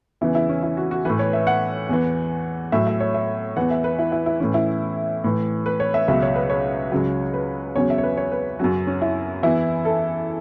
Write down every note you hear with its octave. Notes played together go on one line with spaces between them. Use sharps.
E2 C#3 E3 E4
E4
C#4
E4
F#4
F#4
A2 E3 B4
C#5
E5
F#5
E2 E3
A2 F#3 E5
E5
C#5
E5
E2 E3 F#5
E5
B4
E4
E4
E4
A2 E3 C#4
E4
A2 E3
B4
C#5
E5
C#2 B2 F#3 E5
C#5
B4
C#5
C#2 C#3 F#3
B4
E2 C#3 F#3 C#5
E5
C#5
B4
C#5
B4
F#2 C#3 F#3 F#4
C#4
E4
E2 E3 E4
A4